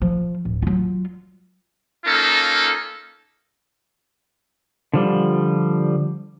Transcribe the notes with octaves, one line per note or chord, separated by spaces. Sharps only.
F3
D1
F#3 F4
A#3 C#4 D#4 F4 A4
D3 F3 G3